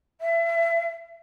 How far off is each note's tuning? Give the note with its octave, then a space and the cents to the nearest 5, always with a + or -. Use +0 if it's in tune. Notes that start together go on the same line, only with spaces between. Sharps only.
E5 +30